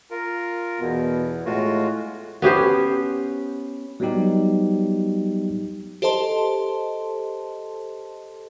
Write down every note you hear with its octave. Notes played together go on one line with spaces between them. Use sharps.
F4 A#4
E2 B2
A2 G#3 F4 F#4
B3 C#4 G4 C5
F#3 G3 B3 D#4 G4
G4 A4 C5 D#5 A5 C6